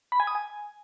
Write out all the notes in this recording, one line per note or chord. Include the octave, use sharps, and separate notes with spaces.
B5
G#5
D#6
G#5